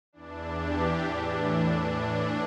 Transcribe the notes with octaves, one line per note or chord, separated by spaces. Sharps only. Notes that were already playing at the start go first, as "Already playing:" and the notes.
E2 E3 D4
G4
A2 E3 D4
A2 E3 D4